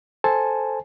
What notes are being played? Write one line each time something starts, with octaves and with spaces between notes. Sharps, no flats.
A4 C5 G#5 A5